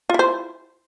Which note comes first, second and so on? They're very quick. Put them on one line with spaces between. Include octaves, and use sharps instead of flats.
F4 E4 C5